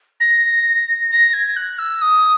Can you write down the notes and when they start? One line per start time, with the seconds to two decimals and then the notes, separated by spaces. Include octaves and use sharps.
0.20 A#6
1.11 A#6
1.33 G#6
1.56 F#6
1.79 E6
2.02 D#6